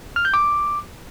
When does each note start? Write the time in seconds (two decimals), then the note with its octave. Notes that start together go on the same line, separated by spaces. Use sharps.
0.16 F6
0.25 G6
0.34 D6